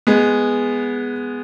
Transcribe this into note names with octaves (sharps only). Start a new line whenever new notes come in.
G#3 B3